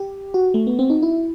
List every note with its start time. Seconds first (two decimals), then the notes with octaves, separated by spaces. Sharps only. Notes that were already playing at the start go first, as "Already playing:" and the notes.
Already playing: G4
0.34 F#4
0.54 A3
0.67 B3
0.79 C4
0.90 D#4
1.02 E4